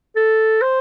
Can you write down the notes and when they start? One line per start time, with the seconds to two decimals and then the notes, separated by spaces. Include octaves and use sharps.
0.16 A4
0.62 C5